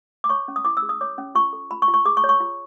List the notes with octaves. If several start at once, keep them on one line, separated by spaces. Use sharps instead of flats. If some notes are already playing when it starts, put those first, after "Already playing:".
D6
C#5 C#6
C#4
D#6
E4 D6
E6
G#4
D#6
C#5 D6
C#4
F4 C#6
A4
F4 B5
C#6
F4
C#6
G#4 D6
C#6
C#5
C#6
F4